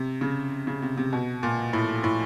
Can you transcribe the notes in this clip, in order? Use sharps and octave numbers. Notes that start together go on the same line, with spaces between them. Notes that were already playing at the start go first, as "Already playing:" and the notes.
Already playing: C3
C#3
C#3
C3
C3
B2
A#2
A2
A2